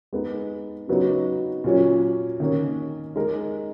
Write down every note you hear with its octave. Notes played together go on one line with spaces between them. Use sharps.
G#3 B3 D#4
C#3 F#3 B3 D#4 F#4
A#2 F#3 C#4
D#3 A#3 C#4
G#3 D#4 A#4